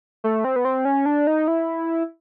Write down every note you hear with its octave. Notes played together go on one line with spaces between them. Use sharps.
A3
C4
B3
C4
C#4
D4
D#4
E4